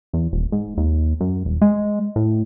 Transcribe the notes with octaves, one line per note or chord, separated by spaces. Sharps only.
E2
D#1
G#2
D#2
F#2
D#1
G#3
A2